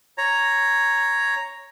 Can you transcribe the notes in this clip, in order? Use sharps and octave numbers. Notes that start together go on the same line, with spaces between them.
C#5 A#5